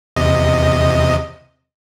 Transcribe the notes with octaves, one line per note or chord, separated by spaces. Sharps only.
E2 C3 D#5